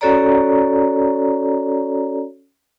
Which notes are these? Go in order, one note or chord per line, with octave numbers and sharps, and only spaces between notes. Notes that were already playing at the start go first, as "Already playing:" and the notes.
C#4 F#4 A4 C#5 D5 A#5